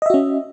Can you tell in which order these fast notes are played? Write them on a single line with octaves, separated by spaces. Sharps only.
D#5 E5 F#4 C#4